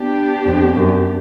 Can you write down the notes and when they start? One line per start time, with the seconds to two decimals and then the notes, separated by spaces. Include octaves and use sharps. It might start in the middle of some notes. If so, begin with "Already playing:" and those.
Already playing: B3 D4 G4
0.46 F2
0.75 F#2